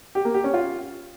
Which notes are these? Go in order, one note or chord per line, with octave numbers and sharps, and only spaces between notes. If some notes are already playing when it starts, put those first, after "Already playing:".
G4
A#3
G4
C#4
F4